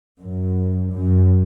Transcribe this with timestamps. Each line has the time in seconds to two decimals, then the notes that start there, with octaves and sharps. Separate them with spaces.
0.20 F#2
0.94 F#2